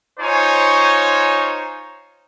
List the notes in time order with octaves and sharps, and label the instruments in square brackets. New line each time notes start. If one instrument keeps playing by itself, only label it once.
[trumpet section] D#4 F4 C5 C#5 G#5